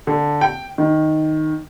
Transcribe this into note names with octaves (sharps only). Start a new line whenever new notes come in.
D3
G5
D#3